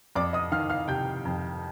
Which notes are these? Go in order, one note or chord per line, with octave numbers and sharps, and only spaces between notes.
F2 D5 D6
D#5 D#6
D#3 F5 F6
F5 F6
C3 G5 G6
F2